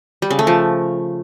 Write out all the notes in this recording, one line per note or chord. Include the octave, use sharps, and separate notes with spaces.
G3
C#3
A3
F3